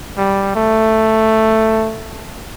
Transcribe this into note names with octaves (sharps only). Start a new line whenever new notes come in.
G3
A3